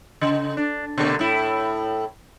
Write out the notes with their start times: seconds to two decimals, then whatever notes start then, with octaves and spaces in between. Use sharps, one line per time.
0.21 C#3
0.57 D4
0.98 B2 D3 A#3
1.19 A2 E4